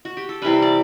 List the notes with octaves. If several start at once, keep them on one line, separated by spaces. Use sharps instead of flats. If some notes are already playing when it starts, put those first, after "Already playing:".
F#4
G4
A4
C3 E3 G3 B4
D5